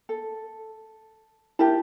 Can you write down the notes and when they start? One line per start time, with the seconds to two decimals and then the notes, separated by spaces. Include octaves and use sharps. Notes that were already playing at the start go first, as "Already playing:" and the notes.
0.09 A4
1.59 E4 G4 A#4 A5